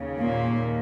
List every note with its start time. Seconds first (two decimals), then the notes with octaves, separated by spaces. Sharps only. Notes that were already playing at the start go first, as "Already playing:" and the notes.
Already playing: D#2 C#3
0.19 A#2 A#3
0.49 D#2